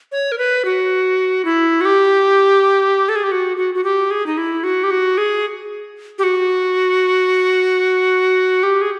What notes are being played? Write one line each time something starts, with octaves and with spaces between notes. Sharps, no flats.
C#5
A#4
B4
F#4
E4
F#4
G4
A4
G#4
G4
F#4
F#4
F#4
G4
G#4
D#4
E4
F#4
G4
F#4
G#4
G4
F#4
G4
G#4